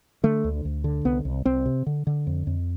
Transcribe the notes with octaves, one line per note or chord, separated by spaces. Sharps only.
D3 A3
D2
D2
D3
C2 B3
C2
C2 C4
C3
D3
D3
F2
F2